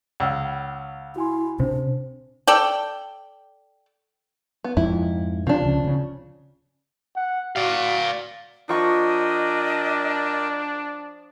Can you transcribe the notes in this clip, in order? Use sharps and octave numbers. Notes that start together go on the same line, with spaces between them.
C#2 F#5 E6 F6
E4 F#4 G#5 C6
C3 D4 C5
A4 D5 G5
B3
F2 G#2 F3 E4
C3 F3 D4
C#2 C#3
C#3 C#4
F#5
F#4 D5 F5
F3 D4 A#4 D5 D#5 G5 C#6